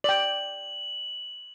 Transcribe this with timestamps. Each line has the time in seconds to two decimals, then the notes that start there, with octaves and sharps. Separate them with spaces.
0.04 D5 G5 F#7